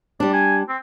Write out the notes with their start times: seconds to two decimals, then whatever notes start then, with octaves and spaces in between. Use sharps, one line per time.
0.20 G3 D4 D5
0.33 G#5
0.69 C4